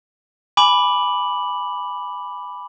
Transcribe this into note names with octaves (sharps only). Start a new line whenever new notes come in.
G#5 B5 D6 F#7